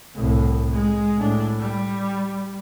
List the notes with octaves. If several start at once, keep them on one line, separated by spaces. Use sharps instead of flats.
C2 A2
G#3
A2 D4
G3